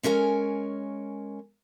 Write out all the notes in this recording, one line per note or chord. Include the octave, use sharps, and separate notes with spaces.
G#3 C#4 A#4 C#5 G#5